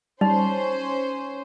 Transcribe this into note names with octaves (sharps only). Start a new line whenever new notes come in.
G3 C#4 D#4 C5